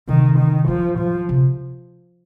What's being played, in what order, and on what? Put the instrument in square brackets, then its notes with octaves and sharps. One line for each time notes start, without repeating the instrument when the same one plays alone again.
[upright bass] C3 [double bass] D#3
[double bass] D#3
[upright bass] D#3 [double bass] F3
[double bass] F3
[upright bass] C3